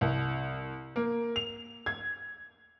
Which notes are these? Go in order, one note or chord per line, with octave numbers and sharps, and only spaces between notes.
C2
A#3
F7
G#6